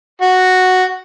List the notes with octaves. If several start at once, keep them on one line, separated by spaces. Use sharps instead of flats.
F#4